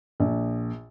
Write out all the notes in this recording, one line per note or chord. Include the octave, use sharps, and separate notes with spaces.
A#1